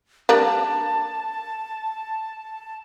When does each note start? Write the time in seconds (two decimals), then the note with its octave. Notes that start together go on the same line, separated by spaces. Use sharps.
0.29 G3 A#3 D4 A5